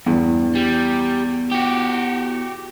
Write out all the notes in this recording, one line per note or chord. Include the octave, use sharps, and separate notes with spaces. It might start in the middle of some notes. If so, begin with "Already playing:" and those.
E2 G2
G3
F#4 G4